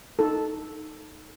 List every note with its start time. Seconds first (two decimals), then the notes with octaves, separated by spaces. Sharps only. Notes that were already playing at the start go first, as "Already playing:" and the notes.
0.19 D#4 A4